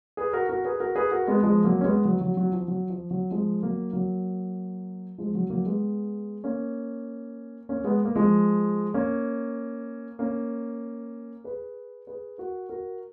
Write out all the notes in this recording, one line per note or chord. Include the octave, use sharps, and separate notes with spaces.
G#4 B4
F#4 A#4
F#4 A#4
G#4 B4
F#4 A#4
G#4 B4
F#4 A#4
G#3 B3
F3 G#3
F#3 A#3
C#4
G#3 B3
F#3
F#3
F#3
F3
F#3
F3
F#3
F3 G#3
F#3 A#3
F#3 A#3
F3 G#3
F#3
F#3 A#3
G#3 B3
A#3 C#4
A#3 C#4
G#3 B3
A#3
F3 G#3
A#3 C#4
A#3 C#4
G#4 B4
G#4 B4
F#4 A#4
F#4 A#4